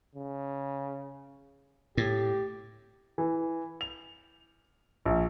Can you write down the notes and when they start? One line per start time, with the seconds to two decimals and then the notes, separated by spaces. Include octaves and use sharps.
0.15 C#3
1.97 A2 G4
3.18 E3
3.81 F7
5.05 A#1